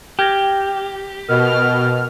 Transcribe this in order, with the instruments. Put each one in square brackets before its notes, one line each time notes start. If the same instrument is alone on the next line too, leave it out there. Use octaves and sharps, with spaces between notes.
[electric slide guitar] G4 [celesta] F6 G#6 A#6
[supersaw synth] B2 [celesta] A#4 D#5 [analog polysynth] F6